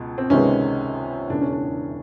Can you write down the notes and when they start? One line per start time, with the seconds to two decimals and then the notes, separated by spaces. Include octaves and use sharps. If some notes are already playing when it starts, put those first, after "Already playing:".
Already playing: C#2 B2
0.18 C4
0.30 C#2 C3 D#3 G#3 B3 C#4
1.30 E1 E2 C#3 E3 D4
1.41 C#4
1.53 D4